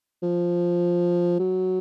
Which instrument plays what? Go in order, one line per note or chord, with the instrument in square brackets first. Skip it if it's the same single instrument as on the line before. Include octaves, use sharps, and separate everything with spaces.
[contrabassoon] F3
F#3